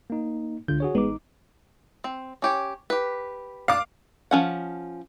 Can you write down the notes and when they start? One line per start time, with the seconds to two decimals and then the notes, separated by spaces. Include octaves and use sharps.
0.10 A#3 D#4
0.68 C#2 D3 F4 G6
0.80 F#4 G#4 C#5
0.95 A1 G#3 B3 D#4 D6
2.04 C4
2.42 C#4 G4 C#5
2.90 G4 B4
3.68 D4 F5 D6
4.31 F3 C#4 F#5